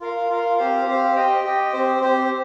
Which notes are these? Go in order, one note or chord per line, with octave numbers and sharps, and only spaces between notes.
F4 A#4 F5
F4 A#4 F5
C4 G4 C5 F5
C4 G4 C5 F5
G4 D#5 G5
G4 D#5 G5
C4 G4 C5
C4 G4 C5